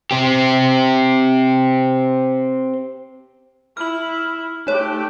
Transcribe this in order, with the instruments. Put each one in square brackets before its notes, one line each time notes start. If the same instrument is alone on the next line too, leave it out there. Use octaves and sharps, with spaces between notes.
[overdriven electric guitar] C4 G4
[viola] E4 [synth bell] F6 F#7
[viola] A3 G4 [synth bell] D#4 C#5